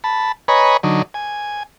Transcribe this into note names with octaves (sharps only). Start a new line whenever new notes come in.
A5 B5
B4 C#5 D#5 G#5 A#5 B5
D3 F#3 D#4
G#5